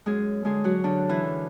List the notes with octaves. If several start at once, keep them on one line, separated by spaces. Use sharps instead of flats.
F#2 G#3 G#4
D3 G#3 G#4
F#3 F#4
F#2 D3 D4
E3 E4
D3